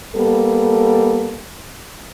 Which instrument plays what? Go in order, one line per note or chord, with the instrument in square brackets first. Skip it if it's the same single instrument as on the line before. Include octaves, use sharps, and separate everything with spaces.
[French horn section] G3 A#3 B3 A4